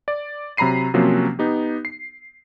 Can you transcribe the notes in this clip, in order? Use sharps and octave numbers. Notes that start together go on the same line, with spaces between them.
D5
C3 F#3 A#5 B5 C7 D#7
C3 F3 F#3 A#3 C4 C#4
B3 D#4 G4
C7